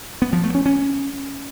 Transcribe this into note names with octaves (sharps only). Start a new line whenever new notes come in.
B3
F3
A3
C#4
C#4